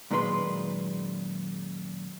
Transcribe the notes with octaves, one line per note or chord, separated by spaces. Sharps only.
F#2 A#2 D#3 G#3 B4 C6